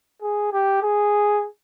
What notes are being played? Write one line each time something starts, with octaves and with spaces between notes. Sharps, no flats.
G#4
G4
G#4